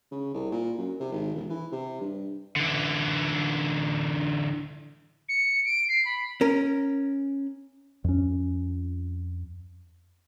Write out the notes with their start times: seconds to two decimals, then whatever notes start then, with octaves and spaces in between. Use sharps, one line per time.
0.11 C#3
0.34 C2
0.51 A#2
0.78 F#2
1.00 C3
1.12 G#1
1.35 E1
1.50 E3
1.72 C3
2.01 G2
2.56 D3 E3
5.29 C#7
5.65 D7
5.89 C7
6.05 B5
6.41 C#4 A#4
8.04 F2 C#4